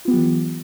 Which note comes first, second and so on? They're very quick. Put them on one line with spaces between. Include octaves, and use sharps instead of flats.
F4 B3 G4 F#3 E3